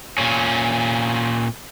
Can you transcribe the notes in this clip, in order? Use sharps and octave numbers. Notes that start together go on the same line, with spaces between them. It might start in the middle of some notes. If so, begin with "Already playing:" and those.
A#2 C#4